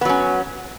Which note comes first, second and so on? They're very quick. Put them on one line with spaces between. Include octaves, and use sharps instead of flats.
B3 F#3 C#4